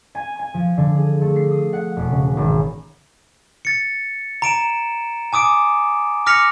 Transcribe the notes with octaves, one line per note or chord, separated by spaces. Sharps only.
G#5
G#5
F3
D3
G#4
A3
C7
D#6
F#5
E1
C#3
G#1
A6 C#7
A#5 D7 E7
G#5 D6 D#6 D7
D6 F6 A#6 B6 C#7 F7